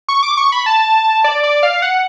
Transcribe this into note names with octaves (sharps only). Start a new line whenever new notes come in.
C#6
D6
C#6
B5
A5
D5
D5
F5
F#5